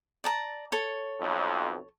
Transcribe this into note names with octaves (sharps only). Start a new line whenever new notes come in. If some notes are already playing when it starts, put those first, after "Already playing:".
D5 A5 A#5
A4 C#5
B1 F2